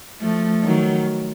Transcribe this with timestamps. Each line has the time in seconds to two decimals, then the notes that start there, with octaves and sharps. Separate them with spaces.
0.21 F3 A3
0.64 D#3 F#3